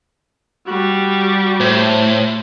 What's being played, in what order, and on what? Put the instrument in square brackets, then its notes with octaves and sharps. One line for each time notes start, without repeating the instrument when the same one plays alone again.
[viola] G3 [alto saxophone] F#4
[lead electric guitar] A2 [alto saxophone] C5